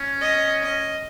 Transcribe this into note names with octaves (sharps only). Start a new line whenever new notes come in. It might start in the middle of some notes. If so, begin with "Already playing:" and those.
Already playing: C#4
D#5
D#5